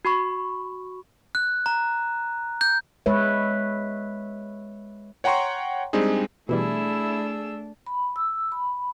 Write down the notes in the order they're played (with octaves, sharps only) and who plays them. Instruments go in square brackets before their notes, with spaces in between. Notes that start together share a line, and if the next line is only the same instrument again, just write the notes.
[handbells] F#4 B5 C#6
[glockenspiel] F#6
A#5
G6
[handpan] G#3 B4 C#5 E5
[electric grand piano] C#5 F#5 G5 A#5 C6 C#6
G3 G#3 C4 D4 D#4 G#4
[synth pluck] B2 E3 G3 [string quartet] A3 D4 [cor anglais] E4 [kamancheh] G#4 E6
[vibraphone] B5
E6
B5